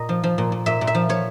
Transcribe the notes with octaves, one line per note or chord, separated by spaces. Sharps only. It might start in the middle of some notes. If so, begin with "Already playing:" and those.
Already playing: A#2 D#5
F3
F3
A#2
A#2
A#2 E5
A#2
E5
F3
F3 C#5